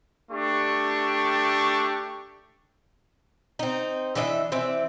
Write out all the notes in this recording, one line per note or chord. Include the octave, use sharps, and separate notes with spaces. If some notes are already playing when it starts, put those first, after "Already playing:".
A3 D4 G4 C#6
C4 D#4
E3 D4 D#5 E5
E3 C4 D5 E5